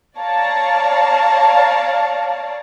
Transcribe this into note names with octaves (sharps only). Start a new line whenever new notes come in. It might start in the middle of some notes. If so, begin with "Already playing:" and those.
C#5 D5 F5 A5 A#5